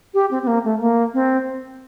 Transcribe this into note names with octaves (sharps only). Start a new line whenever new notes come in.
G4
C4
C4
A#3
A3
A#3
C4